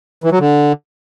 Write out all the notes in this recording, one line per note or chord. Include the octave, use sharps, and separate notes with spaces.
E3
F#3
D3